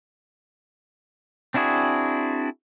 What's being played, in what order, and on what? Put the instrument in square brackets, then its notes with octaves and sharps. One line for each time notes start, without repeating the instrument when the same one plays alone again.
[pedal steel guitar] C4 D4 E4 F#4 G#4